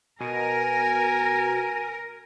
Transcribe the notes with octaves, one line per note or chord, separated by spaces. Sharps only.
B2 A#4 G#5